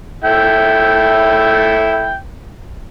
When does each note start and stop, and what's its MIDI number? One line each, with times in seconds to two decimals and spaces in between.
0.24 2.16 57
0.24 2.16 64
0.24 2.16 79